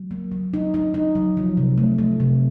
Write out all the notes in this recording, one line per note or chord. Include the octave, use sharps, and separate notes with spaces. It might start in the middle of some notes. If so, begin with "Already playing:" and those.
Already playing: F#3
A#3
F#3
D#4
D#4
D#4
F#3
F3
C3
A3
A3
C3